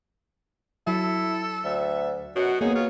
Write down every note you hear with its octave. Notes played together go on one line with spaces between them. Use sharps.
F#3 E4 A4
D2 E5
F#2 B2 F#4
F#3 A#3 B3 D#4 G#4
F4 C#5